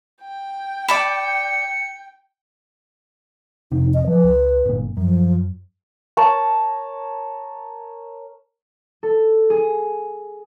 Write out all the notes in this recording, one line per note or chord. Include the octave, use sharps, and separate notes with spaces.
G5
D5 A5 B5 C#7
F1 C3 D#4
D#5
F3 B4
C#2
G1 A#2
F#2 F3
A#4 C#5 A5
A4
G#4